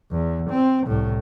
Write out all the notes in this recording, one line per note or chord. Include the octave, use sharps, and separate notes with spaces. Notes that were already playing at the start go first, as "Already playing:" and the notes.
E2
C4
C2 A2